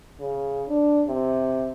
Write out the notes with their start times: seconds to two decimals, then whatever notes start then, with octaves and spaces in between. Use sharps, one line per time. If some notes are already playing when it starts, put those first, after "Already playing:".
0.20 C#3
0.69 D4
1.07 C3